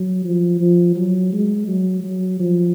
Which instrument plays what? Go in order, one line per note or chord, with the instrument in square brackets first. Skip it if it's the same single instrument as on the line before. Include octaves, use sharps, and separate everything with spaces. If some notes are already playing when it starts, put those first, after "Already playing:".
Already playing: [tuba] F#3
F3
F3
F#3
G#3
F#3
F#3
F3